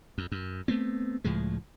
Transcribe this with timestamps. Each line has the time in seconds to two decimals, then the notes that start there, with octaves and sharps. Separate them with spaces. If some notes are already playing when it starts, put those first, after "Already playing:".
0.18 F2
0.32 F#2
0.68 A3 B3 C4
1.24 C#2 A2 F3 G#3